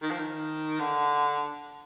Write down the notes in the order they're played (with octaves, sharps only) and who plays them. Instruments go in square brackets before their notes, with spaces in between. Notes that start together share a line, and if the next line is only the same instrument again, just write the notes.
[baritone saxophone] D#3
F3
D#3
D3